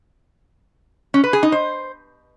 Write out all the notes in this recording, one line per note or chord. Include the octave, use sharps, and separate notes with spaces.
C#4
B4
G#4
D#4
C5